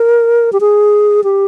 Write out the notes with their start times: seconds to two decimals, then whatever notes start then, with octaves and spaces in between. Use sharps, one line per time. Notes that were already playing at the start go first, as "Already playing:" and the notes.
Already playing: A#4
0.53 G4
0.60 G#4
1.24 G4